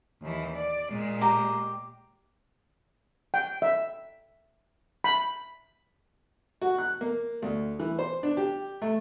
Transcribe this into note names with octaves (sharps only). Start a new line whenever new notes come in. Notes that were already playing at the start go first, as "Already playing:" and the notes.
D#2 E3
D5
A#2 G#3
G4 A#5
G5
E5
B5
F#4
F#6
A#3
D2
E3
C5
D4
G4
A3